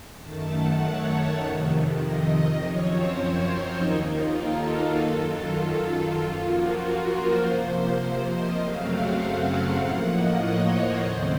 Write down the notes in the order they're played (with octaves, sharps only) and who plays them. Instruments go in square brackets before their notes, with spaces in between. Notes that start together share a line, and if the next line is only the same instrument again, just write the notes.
[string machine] F#2 D#3 A3 A5
F#5
C#5
F2 C3 D#3
D#5
D#5
F#2 F3 C4 C#5
C5
C5
D#4
D#2 D#3 A#3
F4
A4
F#4
F#2 D#3 F#3 A4
F4
F4
F#2 F3 A#3 F4
F#4
A#4
C5
C3 F3 A#3 C5
D#5
F#2 C#3 F#3 A3 C4 F5
F#5
F#5
A2 F3 A#3
D#5
C#5
C5
D#2 C#3 A3 C4 C5